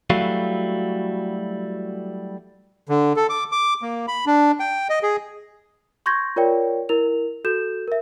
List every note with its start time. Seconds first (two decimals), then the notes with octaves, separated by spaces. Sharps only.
0.10 F#3 G3 A3 E4 F#4 F5
2.89 D3
3.16 A4
3.29 D6
3.52 D6
3.82 A#3
4.08 B5
4.26 D4
4.60 G5
4.89 D#5
5.03 G#4
6.06 C6 C#6 G6 G#6 A#6
6.36 F4 A#4 C#5 D5 G5
6.89 E4 A#4 F7
7.45 F#4 A4 G6 E7
7.88 A#4 E5